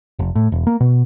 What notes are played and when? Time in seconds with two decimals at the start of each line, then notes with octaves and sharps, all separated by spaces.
0.19 F1
0.35 A2
0.52 E1
0.67 A#3
0.80 B2